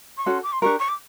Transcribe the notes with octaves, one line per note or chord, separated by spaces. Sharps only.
C#6
C#4 F#4 A4 C6
D6
C6
D4 G4 A#4 C#6
C#6
D6